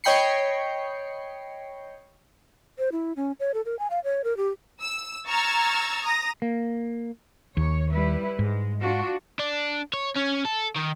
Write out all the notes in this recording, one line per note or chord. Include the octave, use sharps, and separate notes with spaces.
C#5 D#5 G5 B5 C7 C#7
C5
E4
C#4
C#5
A4
A#4
G#5
F5
C#5
A#4
G4
E6
A#5 C#6 E6 F6 G#6 A6
A#5 D#6 A#6
A#3
D#2 C#5
G3 E4 B4
G#2 G#3
D4 F4 F#4
D4
C#5
C#4
A4
D#3